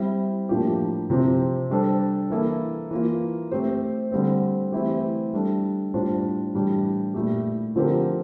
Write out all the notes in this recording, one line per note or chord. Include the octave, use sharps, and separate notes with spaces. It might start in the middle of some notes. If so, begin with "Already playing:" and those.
Already playing: G3 C4 E4
A2 F3 A#3 D4 G4
C3 F3 C4 G4
G3 D4 A4 C5
E3 A#3 E4 A4
E3 A#3 F4
A3 C4 G4 C5
D3 G3 C4
E3 A3 C4 E4 G4
G3 D4 A4
A2 G3 D4 F4 C5
A2 E3 G3 D4 G4
A#2 A3 E4 G4
D3 F3 C4 G4 A#4